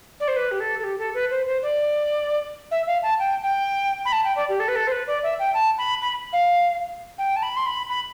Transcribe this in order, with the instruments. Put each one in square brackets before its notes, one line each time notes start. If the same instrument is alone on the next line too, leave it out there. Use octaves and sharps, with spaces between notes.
[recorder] D5
C5
B4
G4
A4
A4
G4
A4
B4
C5
C5
D5
E5
F5
A5
G5
G5
B5
A5
G5
D5
G4
A4
B4
A4
C5
B4
D5
E5
G5
A5
B5
B5
F5
G5
A5
B5
C6
B5
B5